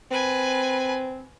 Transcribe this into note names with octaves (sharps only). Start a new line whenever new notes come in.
C4 B4 G#5